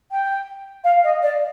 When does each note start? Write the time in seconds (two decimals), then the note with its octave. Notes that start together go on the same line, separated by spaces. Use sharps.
0.11 G5
0.84 F5
1.04 D#5
1.22 D5